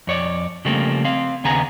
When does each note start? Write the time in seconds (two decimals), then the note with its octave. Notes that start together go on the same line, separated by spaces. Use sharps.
0.07 F2 C#5 D5
0.65 C#3 F3 G3 A3 A#3 C4
1.05 C4 F5
1.44 D#2 C#3 B3 G#4 A#5